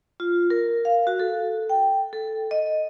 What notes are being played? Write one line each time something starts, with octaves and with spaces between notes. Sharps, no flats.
F4
A#4
F5
F#4
A4
G5
A4
D#5